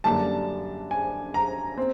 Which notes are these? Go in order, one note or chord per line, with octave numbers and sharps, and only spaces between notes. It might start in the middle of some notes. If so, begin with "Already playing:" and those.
F#2 D3 G3 A#3 D4 A5
G#5
A#5
C4